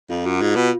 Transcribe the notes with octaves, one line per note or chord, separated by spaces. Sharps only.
F2 F4
F#2 F#4
G#2 F4
B2